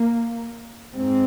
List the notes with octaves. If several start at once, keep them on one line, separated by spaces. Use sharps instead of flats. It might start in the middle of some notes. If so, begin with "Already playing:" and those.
Already playing: A#3
G#2 C4